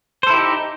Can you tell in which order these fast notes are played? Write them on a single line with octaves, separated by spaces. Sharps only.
C5 A4 E4 G4 D#4